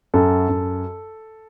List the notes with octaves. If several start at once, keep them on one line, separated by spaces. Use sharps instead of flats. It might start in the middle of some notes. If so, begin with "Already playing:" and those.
F#2 A4
F#2